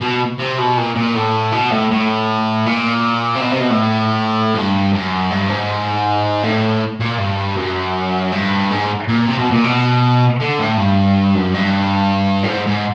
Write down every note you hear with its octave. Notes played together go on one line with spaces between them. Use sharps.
B2
C3
B2
A#2
A#2
A2
B2
A2
A2
A#2
C3
B2
C3
B2
A2
G2
F#2
G2
G#2
A2
A#2
G2
F#2
G2
G#2
A#2
C3
B2
A#2
B2
D3
A2
G2
F#2
G2
A2
G#2
G#2